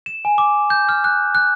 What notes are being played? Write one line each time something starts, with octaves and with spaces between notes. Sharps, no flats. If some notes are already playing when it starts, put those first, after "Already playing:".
E7
G#5
D6
G6
F6
F#6
F#6